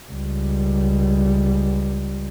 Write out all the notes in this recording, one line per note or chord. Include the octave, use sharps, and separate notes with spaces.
C#2 G3